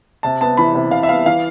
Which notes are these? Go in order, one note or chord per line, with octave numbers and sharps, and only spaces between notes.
C3 A5
B3 A5
E3 B5
C3
C3 F5
E5
B3 F5
E3 F5